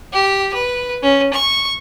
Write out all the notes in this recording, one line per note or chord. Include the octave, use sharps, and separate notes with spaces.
G4
B4
C#4
C#6